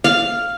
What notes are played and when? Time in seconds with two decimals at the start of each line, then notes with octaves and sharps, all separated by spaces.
0.04 F5